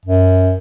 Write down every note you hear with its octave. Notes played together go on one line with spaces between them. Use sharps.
F#2